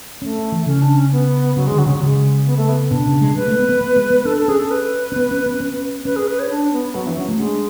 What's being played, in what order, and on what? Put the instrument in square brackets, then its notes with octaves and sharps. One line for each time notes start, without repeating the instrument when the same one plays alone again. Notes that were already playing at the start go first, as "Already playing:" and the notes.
[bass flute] A3 [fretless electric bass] C#4
[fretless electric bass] E3
[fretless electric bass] C#3 [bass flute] C#4
[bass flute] D4
C#4
B3
[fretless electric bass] C#3 [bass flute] F#3
[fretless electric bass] D3 [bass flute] G#3
[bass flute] F#3
[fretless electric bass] C#3
[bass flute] F#3
[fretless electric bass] D3
[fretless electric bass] C#3 [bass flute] G#3
[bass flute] B3
A3
B3
[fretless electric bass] B2 [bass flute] D4
[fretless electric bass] C#3
G#3
[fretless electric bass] G#3 [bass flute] B4
[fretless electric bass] A3
B3
B3
B3
G#3
B3
[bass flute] B4
[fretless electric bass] D4 [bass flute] A4
[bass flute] A4
[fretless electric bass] C#4 [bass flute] G#4
[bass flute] A4
B4
[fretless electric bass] C#4
B3
C#4
B3
C#4
[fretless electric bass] C#4 [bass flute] B4
[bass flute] G#4
B4
C#5
D4
B3
[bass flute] F#3 [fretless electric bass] B3
[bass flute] E3 [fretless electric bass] D4
[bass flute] F#3 [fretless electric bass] C#4
[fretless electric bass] A3
[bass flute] G#3 [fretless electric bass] D4